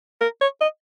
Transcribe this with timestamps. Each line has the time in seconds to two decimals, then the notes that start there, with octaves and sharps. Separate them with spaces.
0.21 A#4
0.41 C#5
0.61 D#5